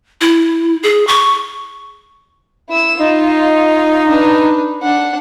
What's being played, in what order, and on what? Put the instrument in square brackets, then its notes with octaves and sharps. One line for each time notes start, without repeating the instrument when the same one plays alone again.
[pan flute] E4
G#4
C#6
[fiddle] E4 E6
[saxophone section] D#4 [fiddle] F4
[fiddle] D4 B4
D4 F#5